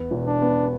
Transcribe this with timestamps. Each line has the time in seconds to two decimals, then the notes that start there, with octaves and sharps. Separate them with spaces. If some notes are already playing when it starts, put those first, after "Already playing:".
Already playing: E2 B3
0.11 E1
0.26 D4
0.42 B3